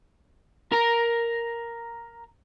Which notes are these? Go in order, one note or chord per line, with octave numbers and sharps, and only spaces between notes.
A#4 A#5